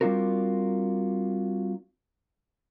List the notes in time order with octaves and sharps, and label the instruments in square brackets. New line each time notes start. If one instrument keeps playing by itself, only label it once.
[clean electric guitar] G3 C4 D4 F4 F#4 A#4